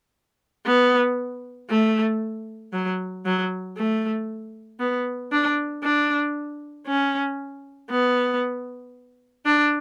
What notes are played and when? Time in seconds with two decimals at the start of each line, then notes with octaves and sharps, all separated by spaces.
0.66 B3
1.70 A3
2.73 F#3
3.25 F#3
3.77 A3
4.80 B3
5.32 D4
5.83 D4
6.87 C#4
7.90 B3
9.46 D4